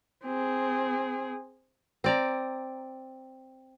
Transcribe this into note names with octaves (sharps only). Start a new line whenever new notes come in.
C4 G#4
C4 D5 A#5